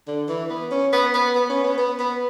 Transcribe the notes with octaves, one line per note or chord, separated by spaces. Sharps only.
D3
E3
B3
C#4
B3
B3
B3
C#4
B3
B3
B3